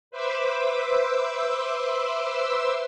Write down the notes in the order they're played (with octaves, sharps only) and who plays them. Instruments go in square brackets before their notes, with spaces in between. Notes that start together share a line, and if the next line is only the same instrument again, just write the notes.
[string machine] B4 C5 E5 C6 D6 E6